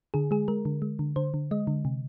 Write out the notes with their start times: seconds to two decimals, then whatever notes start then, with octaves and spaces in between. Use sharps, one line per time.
0.14 D3 G#4
0.31 G#3 G#4
0.48 G#3 A#4
0.65 D3
0.82 G#3
0.99 D3
1.16 D3 C5
1.34 D3
1.51 G#3 D#5
1.67 D3
1.85 C3